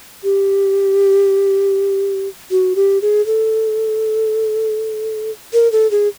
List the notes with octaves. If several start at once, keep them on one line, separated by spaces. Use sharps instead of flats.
G4
F#4
G4
G#4
A4
A#4
A4
G#4